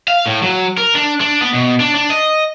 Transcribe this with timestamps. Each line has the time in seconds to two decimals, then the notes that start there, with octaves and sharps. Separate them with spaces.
0.08 F5
0.26 A2
0.43 F#3
0.78 A#4
0.95 D4
1.20 D4
1.41 B3
1.54 B2
1.80 D4
1.95 D4
2.10 D#5